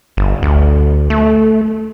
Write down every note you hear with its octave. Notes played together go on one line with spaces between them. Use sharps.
G1
D2
A3